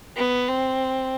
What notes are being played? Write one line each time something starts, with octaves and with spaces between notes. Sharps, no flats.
B3
C4